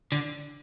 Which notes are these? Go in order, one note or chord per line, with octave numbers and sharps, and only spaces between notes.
D3